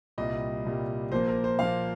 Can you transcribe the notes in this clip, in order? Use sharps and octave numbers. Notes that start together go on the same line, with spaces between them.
C2 A#2 G3 D#5
C2 A#2 G3
A#2 F3 A#3 C5
A#4
C5
A#2 F3 A#3 F5